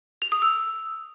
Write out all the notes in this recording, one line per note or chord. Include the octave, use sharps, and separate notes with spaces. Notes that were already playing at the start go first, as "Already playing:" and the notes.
F7
D#6
E6